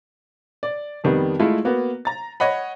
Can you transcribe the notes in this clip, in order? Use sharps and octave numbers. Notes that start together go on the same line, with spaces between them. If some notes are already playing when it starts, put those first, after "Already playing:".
D5
F2 D#3 G3 B3
G#3 A3 E4 F4
A#3 B3 F#4
A#5 A6
C#5 D#5 F#5 B5